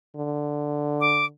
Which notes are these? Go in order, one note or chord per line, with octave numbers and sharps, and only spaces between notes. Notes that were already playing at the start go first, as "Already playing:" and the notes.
D3
D6